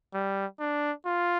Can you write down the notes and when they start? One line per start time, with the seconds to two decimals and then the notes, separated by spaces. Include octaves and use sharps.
0.13 G3
0.60 D4
1.06 F4